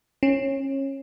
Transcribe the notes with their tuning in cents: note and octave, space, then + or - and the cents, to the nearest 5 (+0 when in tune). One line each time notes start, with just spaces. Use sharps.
C#4 -25